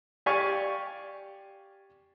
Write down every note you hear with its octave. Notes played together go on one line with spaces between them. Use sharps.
G4 D5 F5 G#5 C#6